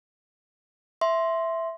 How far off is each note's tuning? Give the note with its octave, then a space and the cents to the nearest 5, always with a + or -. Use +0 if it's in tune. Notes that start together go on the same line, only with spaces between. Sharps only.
E5 +0 C6 +0